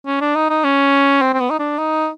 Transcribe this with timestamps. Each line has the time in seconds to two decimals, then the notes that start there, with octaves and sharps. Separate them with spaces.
0.06 C#4
0.21 D4
0.35 D#4
0.50 D#4
0.64 C#4
1.22 C4
1.34 C4
1.40 B3
1.50 D#4
1.59 D4
1.78 D#4